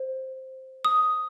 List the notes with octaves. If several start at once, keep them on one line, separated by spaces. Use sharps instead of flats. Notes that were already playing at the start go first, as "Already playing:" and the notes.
Already playing: C5
D#6